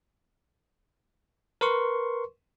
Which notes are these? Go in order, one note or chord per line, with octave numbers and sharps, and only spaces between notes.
A#4 B4 C6 C#6